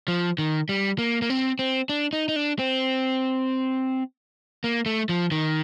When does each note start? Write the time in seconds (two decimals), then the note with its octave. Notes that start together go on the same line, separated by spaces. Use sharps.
0.08 F3
0.38 D#3
0.69 G3
0.98 A#3
1.22 A#3
1.30 C4
1.59 C4
1.89 D4
2.13 D#4
2.29 D#4
2.36 D4
2.59 C4
4.64 A#3
4.86 A3
5.09 F3
5.31 D#3